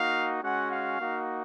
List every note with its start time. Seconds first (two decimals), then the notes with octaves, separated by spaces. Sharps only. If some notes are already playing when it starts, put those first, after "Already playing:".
Already playing: A#3 D#4 F#4 F5
0.42 G#3 C#4 F#4 F#5
0.71 F5
1.00 A#3 D#4 F#4